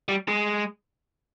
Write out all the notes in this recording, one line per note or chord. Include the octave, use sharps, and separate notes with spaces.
G3
G#3